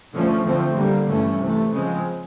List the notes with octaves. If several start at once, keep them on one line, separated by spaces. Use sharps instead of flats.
D3 F3 A3 C#4
D3 F3 A3 C4
D3 G3 A#3
G2 E3 A3 C#4
C3 E3 A3
C#3 F3 G#3 C4